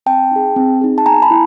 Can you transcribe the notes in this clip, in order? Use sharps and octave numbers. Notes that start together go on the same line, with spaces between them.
C4 G5 A5
D#4 G#4
C4
D#4 G#4
A5
B3 G#5 A#5
A5 B5
E4